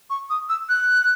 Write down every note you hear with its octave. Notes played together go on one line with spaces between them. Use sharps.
C#6
D#6
E6
F#6